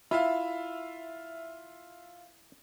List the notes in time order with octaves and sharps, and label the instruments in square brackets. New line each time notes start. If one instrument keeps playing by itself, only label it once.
[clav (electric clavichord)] E4 [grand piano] F4 E5 F5